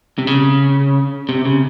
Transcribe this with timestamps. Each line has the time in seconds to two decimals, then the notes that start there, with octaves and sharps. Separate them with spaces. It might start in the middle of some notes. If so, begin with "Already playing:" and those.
0.18 C3
0.27 C#3
1.29 C3
1.45 C#3